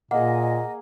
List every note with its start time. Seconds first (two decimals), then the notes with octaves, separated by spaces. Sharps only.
0.11 A#2 A#3 G#4 D#5 F#5